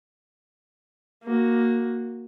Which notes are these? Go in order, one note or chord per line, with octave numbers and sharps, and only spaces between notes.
A#3 F#4